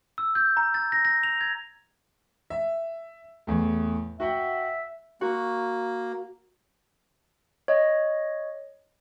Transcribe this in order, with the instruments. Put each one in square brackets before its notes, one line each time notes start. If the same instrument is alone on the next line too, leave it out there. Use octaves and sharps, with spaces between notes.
[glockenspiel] E6
G6
A#5
A6
A#6
A#6
F7
G#6
[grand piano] E5
E2 A2
[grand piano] F#4 F#5 G5 [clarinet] E5
[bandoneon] A#3 [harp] F#4
[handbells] C#5 D#5